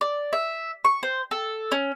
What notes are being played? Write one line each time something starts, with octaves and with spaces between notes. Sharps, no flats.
D5
E5
C#6
C5
A4
C#4